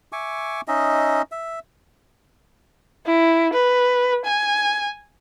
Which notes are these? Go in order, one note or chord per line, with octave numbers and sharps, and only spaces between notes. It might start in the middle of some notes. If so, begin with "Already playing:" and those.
E5 G#5 C#6 D6
C#4 D#4 D#5 E5
E5
E4
B4
G#5